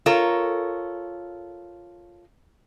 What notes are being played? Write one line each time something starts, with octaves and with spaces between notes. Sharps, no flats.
F4 A4 A#4 C#5